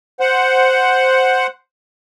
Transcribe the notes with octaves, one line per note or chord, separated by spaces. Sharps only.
C5 F#5